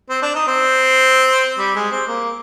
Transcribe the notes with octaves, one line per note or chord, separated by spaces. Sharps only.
C4
D4
D#4
C4
G3
G#3
C4
A#3